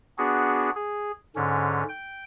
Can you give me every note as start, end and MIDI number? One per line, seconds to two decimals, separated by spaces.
0.18 0.70 59
0.18 0.70 62
0.18 0.70 66
0.18 0.70 68
0.76 1.12 68
1.36 1.83 44
1.36 1.83 50
1.36 1.83 61
1.89 2.24 79